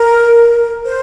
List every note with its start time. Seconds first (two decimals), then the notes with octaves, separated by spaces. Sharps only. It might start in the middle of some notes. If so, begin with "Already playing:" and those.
Already playing: A#4
0.86 C5